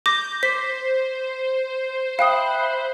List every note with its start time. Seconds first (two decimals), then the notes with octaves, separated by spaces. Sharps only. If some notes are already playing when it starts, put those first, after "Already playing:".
0.06 D6 G6 A#6
0.43 C5 B6
2.19 E5 F5 G5 B5 D#6 F#6